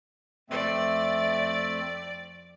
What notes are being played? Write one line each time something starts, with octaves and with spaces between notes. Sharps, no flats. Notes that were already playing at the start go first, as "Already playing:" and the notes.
F2 A3 C4 D5 E5